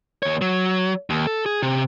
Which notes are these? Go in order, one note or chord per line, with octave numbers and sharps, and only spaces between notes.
D#2 C#5
F#3
D#2
A4
G#4
C3